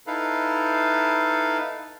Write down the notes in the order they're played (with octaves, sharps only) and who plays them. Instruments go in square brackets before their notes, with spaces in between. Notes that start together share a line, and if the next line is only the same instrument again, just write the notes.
[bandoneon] D#4 E4 A4 B4 F5